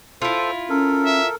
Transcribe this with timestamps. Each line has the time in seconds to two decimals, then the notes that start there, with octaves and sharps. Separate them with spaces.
0.22 E4 F4 A4 C5
0.70 C#4 A4 A#4
1.06 E5